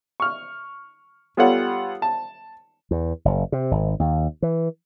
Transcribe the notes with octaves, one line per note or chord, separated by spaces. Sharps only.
C#6 F6
G3 B3 F4 A4 C#5 F#5
A5
E2
F#1
C3
G#1
D#2
E3